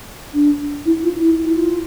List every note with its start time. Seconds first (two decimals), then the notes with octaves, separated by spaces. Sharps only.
0.34 D4
0.85 E4
1.04 F4
1.21 E4
1.44 E4
1.55 F4